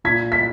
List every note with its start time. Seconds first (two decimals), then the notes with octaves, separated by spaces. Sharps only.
0.04 A#2 G#6 B6
0.32 B6